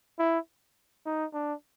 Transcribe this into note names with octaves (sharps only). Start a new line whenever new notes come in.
E4
D#4
D4